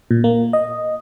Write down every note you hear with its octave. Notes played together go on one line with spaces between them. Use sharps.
A#2
A#3
D#5